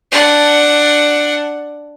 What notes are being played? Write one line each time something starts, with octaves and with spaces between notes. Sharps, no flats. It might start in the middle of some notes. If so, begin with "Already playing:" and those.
D4 F#5